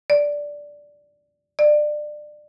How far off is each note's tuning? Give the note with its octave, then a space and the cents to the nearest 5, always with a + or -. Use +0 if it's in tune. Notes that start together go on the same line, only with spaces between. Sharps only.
D5 -5
D5 +25